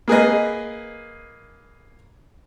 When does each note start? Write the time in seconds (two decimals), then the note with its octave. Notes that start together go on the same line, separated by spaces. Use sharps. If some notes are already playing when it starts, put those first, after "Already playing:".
0.08 A#3 G#4 B4 D#5